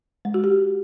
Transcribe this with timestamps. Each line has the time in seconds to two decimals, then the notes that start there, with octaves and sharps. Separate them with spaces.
0.25 G#3
0.34 F#4
0.44 G4